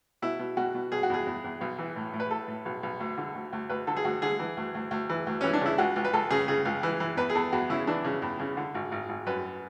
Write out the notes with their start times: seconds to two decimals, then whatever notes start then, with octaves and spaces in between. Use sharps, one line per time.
0.22 B2 E4
0.39 B2
0.57 B2 F#4
0.75 B2
0.92 B2 G#4
1.03 F#4
1.10 E2 G#4
1.27 E2
1.44 E2
1.61 B1
1.78 E3
1.96 A2
2.13 A2
2.20 B4
2.30 A2 A4
2.48 A2
2.65 B1
2.83 B1
3.00 D2
3.17 D3
3.35 D2
3.53 D2
3.69 D2 B4
3.87 D3 A4
3.96 G#4
4.04 D2 F#4
4.22 D3 G#4
4.39 E3
4.57 D2
4.75 D2
4.91 D2
5.09 E3
5.27 D2
5.41 E3 C#4
5.53 D4
5.61 C#3 E4
5.78 C#2 F#4
5.96 C#2
6.04 B4
6.13 C#2 A4
6.30 C#3 G#4
6.48 C#3 G#4
6.65 C#2
6.83 E3
7.00 E3
7.17 E2 B4
7.29 G#4
7.35 E2 A4
7.52 E2 F#4
7.70 C#3 E4
7.87 E3 D4
8.04 C#3
8.22 E2
8.39 C#3
8.57 D3
8.74 G#1
8.92 G#1
9.09 G#1
9.26 F#2 B4